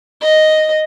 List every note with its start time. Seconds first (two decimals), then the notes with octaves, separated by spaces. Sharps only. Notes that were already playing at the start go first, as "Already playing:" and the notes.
0.22 D#5